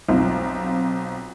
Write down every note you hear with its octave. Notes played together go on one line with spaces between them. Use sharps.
B1 C4 F4